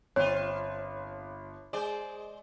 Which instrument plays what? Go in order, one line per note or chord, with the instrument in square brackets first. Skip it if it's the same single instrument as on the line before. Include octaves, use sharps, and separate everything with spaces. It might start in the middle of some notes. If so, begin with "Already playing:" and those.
[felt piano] G1 [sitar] C4 F4 [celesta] C#5
[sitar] G#3 C5 D5 [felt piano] G#4